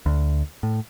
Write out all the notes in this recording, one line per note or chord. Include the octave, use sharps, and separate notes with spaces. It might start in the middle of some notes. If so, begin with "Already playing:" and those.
D2
A2